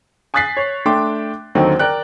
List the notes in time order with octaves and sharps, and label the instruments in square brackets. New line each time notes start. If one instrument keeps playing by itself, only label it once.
[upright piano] G#5 D#6 F#6 A6 B6 C7
C#5
A3 D4 G5 C6 D6
D#2 D3 D#3 F#3 C4 D#4
A#4 D5 G5 F#6